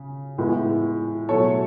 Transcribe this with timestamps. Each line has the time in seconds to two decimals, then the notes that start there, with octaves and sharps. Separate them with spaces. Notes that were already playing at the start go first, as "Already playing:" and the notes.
Already playing: C#3
0.37 A2 E3 G#3 B3
1.29 B2 F#3 A3 A4 C#5